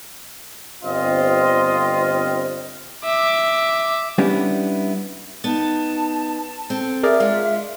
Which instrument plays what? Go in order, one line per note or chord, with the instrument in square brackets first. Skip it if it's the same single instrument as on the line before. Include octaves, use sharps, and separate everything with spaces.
[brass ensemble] G1 C4 F4 D#5
[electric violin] E5 D6
[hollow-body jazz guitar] G3 B3 C#4 D4 E4 G4
[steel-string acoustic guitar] B3 D#4 [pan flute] A5 [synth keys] A6
[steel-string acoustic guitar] C4 A4
[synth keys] G#4 A#4 D5 [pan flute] E5
[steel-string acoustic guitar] G#3 D4 F4 [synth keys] F5